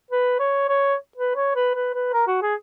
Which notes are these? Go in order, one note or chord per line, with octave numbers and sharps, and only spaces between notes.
B4
C#5
C#5
B4
C#5
B4
B4
B4
A#4
F#4
G#4